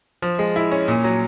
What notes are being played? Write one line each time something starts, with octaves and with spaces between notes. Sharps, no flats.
F3
G#3
E4
C#4
A#2
F#3